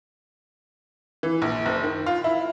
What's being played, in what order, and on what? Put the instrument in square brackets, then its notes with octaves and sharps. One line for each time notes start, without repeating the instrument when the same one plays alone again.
[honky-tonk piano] E3
A#1
F#1
D#3
F4
E4